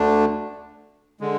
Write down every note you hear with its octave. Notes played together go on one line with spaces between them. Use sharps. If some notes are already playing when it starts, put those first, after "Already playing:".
Already playing: D2 D3 A3 D4
D3 G#3